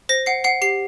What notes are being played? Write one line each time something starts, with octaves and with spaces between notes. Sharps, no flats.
C5 A#6
F#5 C7
F#5 C7
G4 C7